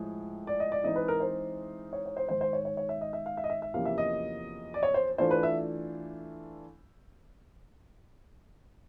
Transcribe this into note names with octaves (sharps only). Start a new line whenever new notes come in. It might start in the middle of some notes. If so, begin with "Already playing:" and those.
Already playing: A2 F3 G#3
D5
D#5
D5
E3 G#3 C4 D#4 D#5
B4
A#4
C5
C#5
C#5
C5
G#2 D#3 G#3 C5
C5
C#5
C#5
C#5
E5
D#5
E5
F5
E5
D#5
E5
E5
E2 C3 F3 A#3 C#4 F5
E5
D#5
D5
C#5
C5
E3 A3 D4 F4 C5
B4
E5